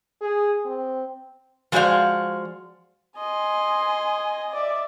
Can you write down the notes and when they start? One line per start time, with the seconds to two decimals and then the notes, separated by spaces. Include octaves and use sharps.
0.21 G#4
0.65 C4
1.72 F3 G#3 F#4 C5 D5 F5
3.18 D#5 G#5 C6
4.52 D5 E5